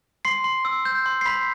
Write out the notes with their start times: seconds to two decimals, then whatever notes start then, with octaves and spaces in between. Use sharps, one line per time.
0.25 C6 C7
0.44 C6
0.65 E6
0.85 G6
1.06 C6
1.21 C7
1.26 B5 C6 B6